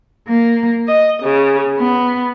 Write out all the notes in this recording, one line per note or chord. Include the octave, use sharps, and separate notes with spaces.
A#3
D#5
C#3
B3